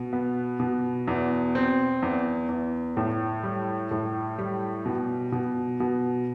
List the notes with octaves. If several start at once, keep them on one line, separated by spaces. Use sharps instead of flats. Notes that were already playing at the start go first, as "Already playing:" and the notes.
Already playing: B2
B3
B2
E2
C4
E2
E2
A2
G3
A2
G3
B2
B2
B2